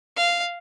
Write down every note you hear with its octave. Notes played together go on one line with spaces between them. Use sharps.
F5